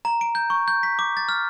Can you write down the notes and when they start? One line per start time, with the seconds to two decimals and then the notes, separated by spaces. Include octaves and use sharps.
0.05 A#5
0.21 D7
0.35 G6
0.50 C#6
0.68 G6
0.83 B6
0.99 D6
1.17 A6
1.29 F6